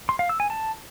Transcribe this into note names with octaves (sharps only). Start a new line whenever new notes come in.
C6
F5
E6
G#5
A5